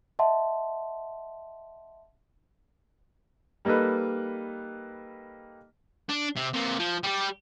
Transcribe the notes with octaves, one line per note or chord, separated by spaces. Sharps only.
D#5 E5 F#5 A5 C6
G3 A#3 D#4 A4 B4
D4
C3
C3 A#3
F3
G3 G4